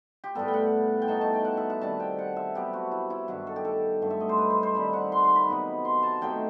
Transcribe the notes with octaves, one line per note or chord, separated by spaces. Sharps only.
G4
A2 G3 B3 A4
G5
F#5
G5
B2 A3 D#4 A5
A5
G5
F#5
E5
F#5
C3 D#3 G3 A5
G5
F#5
E5
C3 F#3 B3 G4
F#4
E4
E4
G2 D#3 F#3 F#4
A4
G4
A4
G2 F#3 A3
E5
D#5
C5
B4
C5
C5
D#3 G3 C4 D#4 B5
F#5
C6
C6
B5
C3 F#3 B3 D#4
C6
A5
C3 F#3 A3 D#4 G5